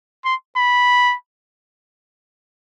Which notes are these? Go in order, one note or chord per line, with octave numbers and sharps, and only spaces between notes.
C6
B5